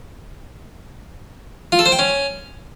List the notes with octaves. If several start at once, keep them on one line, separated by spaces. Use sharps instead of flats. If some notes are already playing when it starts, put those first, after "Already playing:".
F4
A4
C5
G5
C#4